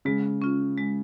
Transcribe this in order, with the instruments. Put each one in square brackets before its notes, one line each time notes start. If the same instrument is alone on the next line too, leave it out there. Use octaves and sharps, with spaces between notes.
[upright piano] C#3 [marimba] G#3
[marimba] C#4 F4
G#3